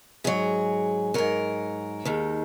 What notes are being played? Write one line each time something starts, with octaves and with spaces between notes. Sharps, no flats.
G#2 F#3 G#4
G#2 F#3 A#4
D#2 D#3 G#3